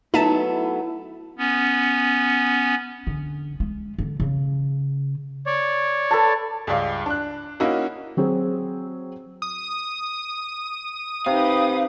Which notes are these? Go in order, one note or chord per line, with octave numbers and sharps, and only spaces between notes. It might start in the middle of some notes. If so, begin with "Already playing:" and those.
F#3 A3 B3 D#4 E4 E5 A5
B3 C#4
D3
G#3
D3
C#3
C#5 D5
A4 B4 A5
C#2 G2 D5 F5
D4 F#6
A#3 C#4 D#4 E4 F#4 A#4
F#3 C4 F#4 G#4
D#6
C3 D#4 G4 B4 F5